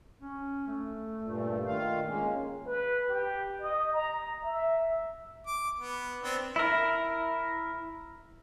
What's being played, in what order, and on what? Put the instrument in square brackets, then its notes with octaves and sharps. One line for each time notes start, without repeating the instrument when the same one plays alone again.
[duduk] C#4
A3
[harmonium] G2 A#2
D#3 F4 F5
G#3 A#3 C#4
[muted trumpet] B4
G4
D#5
A#5
E5
[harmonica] D6
B3
B3 C4 D4
[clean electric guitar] E4 A#4